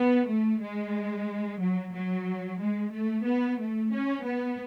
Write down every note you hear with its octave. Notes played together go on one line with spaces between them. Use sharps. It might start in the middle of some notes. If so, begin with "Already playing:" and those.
Already playing: B3
A3
G#3
F#3
F#3
G#3
A3
B3
A3
C#4
B3